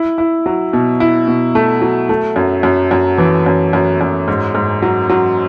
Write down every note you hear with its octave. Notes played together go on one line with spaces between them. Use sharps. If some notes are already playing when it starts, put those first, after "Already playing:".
Already playing: E4
E4
F#3
B2
E4
B2
A3
F#3
A3
F#2
F#2
F#2
E3
F#2
F#2
F#2
G#2
G#2
F#3
F#3